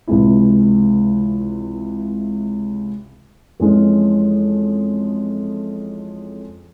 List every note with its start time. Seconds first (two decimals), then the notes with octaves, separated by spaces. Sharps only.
0.07 C#2 C3 E3 G#3 E4
3.60 F2 E3 G#3 C#4